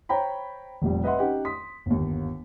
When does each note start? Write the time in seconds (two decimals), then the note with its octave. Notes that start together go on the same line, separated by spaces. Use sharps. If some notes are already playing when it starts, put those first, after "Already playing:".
0.09 C5 C#5 G5 A#5 B5
0.82 F1 A#2 G3
1.04 B4 D#5 E5 F#5 C6
1.19 C#4 D#4 G4 F#5
1.45 C6 D#6 B6
1.86 G1 D#2